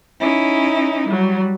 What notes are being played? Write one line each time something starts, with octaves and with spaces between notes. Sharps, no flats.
C#4 D#4 E4
F#3 G3